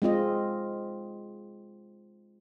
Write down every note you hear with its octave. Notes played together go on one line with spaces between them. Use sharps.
G#3 C4 F4 D#5